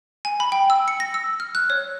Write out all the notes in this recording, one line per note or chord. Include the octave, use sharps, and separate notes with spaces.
G#5
B5
G5
E6
C#7
A#6
E6
F6
F#6
C#5